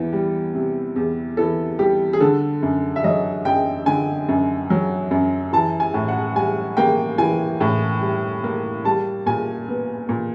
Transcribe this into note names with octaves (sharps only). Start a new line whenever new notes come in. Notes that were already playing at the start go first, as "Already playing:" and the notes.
Already playing: E2 E3
G3
C3
E2
E3 A4
G3 G4
G#4
D3 A4
F#2
E5
F#3 D#5
F#2 G5
D3 G#5
F#2
F#3
F#2
E3 A5
G#5
A2
F#5
G3 G#5
A#3 G5
E3 G#5
A2
G3
A#3
G3 A5
A#2 G#5
B3
A#2